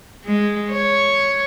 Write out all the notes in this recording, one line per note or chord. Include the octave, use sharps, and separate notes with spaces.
G#3
C#5